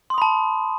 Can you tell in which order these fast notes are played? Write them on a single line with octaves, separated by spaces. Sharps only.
C6 D#6 B5 A5